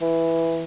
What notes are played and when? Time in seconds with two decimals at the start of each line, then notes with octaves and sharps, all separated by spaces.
0.01 E3